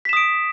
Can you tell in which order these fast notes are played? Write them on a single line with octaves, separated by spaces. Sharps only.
B6 E7 D#6 D7